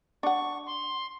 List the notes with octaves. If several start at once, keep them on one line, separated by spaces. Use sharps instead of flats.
D4 F#5 C#6
C6